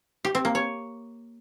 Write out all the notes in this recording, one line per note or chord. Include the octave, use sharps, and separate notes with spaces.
G4
C4
A#3
C#5